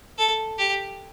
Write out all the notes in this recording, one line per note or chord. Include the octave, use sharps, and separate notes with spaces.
A4
G4